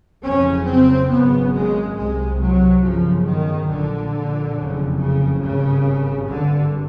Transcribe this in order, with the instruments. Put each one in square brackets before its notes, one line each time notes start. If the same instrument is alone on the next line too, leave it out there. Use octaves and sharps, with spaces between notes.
[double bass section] F#1 F2 C#3 C#4
C4
G#1 F#2 C#3 B3
G#3
C2 C3 G#3
F#3
G1 F#2 C#3 F3
D#3
A#1 A#2 D3
F#1 F2 C#3
C#3
G#1 G2 C#3
G#1 G2 D3